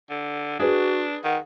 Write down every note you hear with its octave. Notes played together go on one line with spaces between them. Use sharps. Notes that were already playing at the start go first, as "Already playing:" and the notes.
D3
D4 F#4 G#4 B4
D#3 F#5